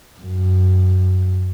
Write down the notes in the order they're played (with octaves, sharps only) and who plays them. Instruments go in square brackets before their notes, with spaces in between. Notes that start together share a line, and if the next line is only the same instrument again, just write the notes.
[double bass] F#2